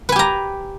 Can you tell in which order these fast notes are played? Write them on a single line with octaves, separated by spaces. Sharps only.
B4 G#5 G4 A#5